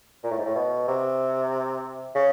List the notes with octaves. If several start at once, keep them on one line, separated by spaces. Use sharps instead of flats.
A#2
A2
G#2
A2
B2
C3
C#3